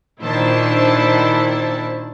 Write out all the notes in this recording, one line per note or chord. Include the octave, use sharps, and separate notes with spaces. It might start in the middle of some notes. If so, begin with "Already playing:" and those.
A#2 D#3 D4 E4 C5 A5